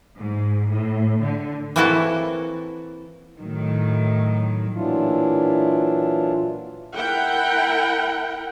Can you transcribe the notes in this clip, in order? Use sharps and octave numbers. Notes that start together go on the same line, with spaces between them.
G#2
A2
D3
E3 A#3 C4 E4 F#4 A4
A2 D#3 F#3
A#2 E3 F#3 D4 E4 F4
E4 A#4 F#5 G5